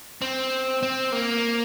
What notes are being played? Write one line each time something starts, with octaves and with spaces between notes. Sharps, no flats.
C4
C4
A#3